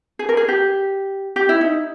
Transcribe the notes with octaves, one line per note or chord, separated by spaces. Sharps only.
G#4
A#4
G#4
G4
G4
E4
D#4